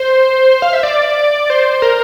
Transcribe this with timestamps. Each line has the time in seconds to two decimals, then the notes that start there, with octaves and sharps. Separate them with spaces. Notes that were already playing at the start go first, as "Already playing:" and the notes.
Already playing: C5
0.62 F5
0.73 E5
0.83 D5
1.50 C5
1.82 A#4